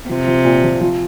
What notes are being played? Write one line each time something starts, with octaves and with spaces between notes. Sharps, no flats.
C3 F3
F3
A#2
F3
F3